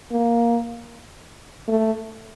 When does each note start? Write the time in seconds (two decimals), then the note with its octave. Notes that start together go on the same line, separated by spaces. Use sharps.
0.12 A#3
1.68 A3